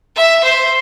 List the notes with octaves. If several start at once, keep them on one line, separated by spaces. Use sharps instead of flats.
E5
C5